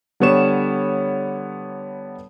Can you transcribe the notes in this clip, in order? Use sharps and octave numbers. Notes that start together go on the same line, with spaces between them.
D3 G3 B3 C#5 C#6 E7